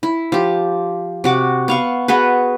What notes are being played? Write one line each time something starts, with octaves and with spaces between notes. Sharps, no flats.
E4
F3 G4
C3 F#4 D6
B3 F5 C#6
B3 F#4 G#4 B4